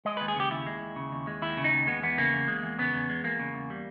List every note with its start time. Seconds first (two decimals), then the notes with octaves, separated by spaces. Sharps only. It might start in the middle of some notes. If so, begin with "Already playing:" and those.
0.05 G#3 D#5
0.17 D#2 B4
0.28 G#4
0.36 C#3 G4
0.51 D#2 E4
0.66 G#3
0.82 D#2
0.96 C#3
1.12 D#2
1.27 G#3
1.42 D#2 E4
1.57 C#3
1.64 D#4
1.73 D#2
1.87 G#3 B3
2.02 E2 B3
2.18 C#3 A#3
2.33 E2
2.48 G#3
2.63 E2
2.79 C#3 B3
2.94 E2
3.09 G#3
3.24 E2 A#3
3.40 C#3
3.54 E2
3.70 G3